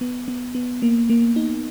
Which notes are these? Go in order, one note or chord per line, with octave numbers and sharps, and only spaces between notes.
B3
B3
B3
A#3
A#3
D#4